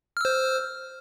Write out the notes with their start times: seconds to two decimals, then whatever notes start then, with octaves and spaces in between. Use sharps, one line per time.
0.17 F6
0.21 E6
0.25 C5